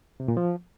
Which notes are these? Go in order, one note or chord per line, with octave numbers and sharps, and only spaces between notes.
C3
A#2
F3